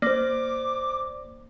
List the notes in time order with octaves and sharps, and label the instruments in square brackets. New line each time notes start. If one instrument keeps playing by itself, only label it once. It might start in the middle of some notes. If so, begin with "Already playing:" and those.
[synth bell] A#3 [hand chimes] C5 D5 [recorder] D6